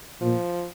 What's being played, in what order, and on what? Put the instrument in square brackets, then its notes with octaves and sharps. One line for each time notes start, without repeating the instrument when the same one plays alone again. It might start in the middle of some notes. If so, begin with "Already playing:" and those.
[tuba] A#2 [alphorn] F3